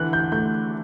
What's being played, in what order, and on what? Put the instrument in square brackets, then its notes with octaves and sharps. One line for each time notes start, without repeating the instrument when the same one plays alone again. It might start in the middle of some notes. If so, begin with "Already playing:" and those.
Already playing: [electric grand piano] D3 E3 [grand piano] F#5 F#6
[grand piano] G6
[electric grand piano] A3 [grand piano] G6